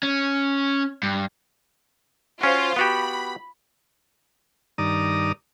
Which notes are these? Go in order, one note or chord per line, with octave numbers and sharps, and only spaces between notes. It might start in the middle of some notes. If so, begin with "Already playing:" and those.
C#4
G2
C#4 F4 F#4 C5
B3 F#4 G4 B5
G2 D#3 D5 A#5 D#6